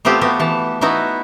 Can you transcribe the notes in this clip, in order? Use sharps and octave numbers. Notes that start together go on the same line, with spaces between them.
A3 B3 C4 F4 G4
B3 F#4 G4
E3 A5
B3 D#4 E4 F#4 B4